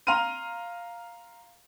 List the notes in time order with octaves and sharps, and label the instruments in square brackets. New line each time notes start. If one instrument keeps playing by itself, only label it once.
[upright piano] F5 A#5 C6 F6 D#7